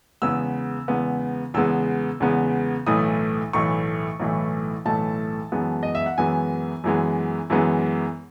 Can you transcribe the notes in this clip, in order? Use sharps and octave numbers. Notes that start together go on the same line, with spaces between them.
E2 C#3 G#3 B3 E6
E2 C#3 G#3 B3
E2 C#3 G#3 B3 E6
E2 C#3 G#3 B3
B1 A2 E3 A3 D#6
B1 A2 E3 A3 C#6
B1 A2 E3 A3
B1 A2 E3 A3 A5
F#2 E3 G#3 B3
D#5
E5
F#5
F#2 E3 G#3 B3 G#5
F#2 E3 G#3 B3
F#2 E3 G#3 B3